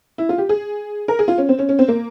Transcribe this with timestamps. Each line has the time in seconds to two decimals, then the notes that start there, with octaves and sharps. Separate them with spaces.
0.18 E4
0.29 F4
0.38 G4
0.49 G#4
1.08 A#4
1.19 G#4
1.28 F4
1.38 C#4
1.49 C4
1.59 C#4
1.69 C#4
1.79 C4
1.88 A#3